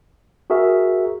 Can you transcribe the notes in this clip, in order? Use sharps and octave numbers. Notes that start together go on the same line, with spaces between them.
F#4 G#4 A#4 E5